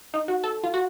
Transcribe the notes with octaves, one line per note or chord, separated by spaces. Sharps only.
D#4
F#4
A4
F4
F#4